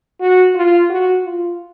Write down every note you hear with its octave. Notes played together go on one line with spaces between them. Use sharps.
F#4
F4
F#4
F4